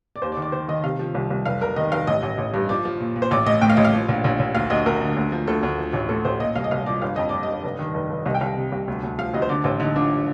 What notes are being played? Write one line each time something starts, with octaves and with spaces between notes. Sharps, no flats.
D5
D#2 C5
D5
D#3
D5
D#3 C5
D#3 D#5
C3 F5
F3
C2
C2
F1 F5
F1 A#4
D#3 D#5
F1 F5
A1 D#5
A1
A1
G2
F3 D5
F3
A#2
A#2
C5
A1 D5
A2 D#5
A2 G5
F5
A1 D#5
F5
F3
A#1
A#1
A#1
D2 F5
D2 D#5
D2 A#4
D3
D2
F3
D2 A4
D2
F3
A1
A2 A4
A1 C5
A#2 D#5
C2 F5
D#5
C2 F5
F3 D5
G1 F5
F2 D#5
F2 D5
D#5
G1
F1
D#3
F1
F1
C2 D#5
G5
C2 F5
C3
C2
D2
D2
F3 F5
D2 D#5
C5
D3 D5
A1 C5
D3 D#4
F3 D4